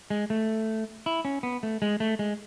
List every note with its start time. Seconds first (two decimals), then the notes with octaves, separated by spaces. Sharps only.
0.10 G#3
0.30 A3
1.06 E4
1.25 C#4
1.43 B3
1.63 A3
1.82 G#3
2.00 A3
2.19 G#3